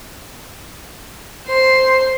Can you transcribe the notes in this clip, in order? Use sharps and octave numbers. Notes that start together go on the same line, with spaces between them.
C5 C6